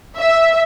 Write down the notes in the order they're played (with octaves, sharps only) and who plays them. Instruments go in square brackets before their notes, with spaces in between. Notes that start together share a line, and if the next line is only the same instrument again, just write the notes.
[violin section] E5